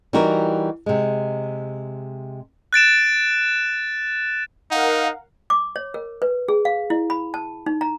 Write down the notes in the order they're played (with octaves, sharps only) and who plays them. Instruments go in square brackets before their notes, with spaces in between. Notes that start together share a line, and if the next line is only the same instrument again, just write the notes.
[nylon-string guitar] E3 G3 D#4 F#4 G4 A#4
C3 G#3
[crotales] F#6 A6 D7 E7
[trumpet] D#4 [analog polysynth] A#4 F5 F#5
[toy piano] D6
C#5
A#4
B4
G#4
F5
E4
B5
A5
D#4
A#5